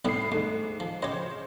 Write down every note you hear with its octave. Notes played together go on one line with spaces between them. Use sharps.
B1 A2 G3 B3 C7
D2 G#2
F3
C#3 G4 C5 C#5 D#5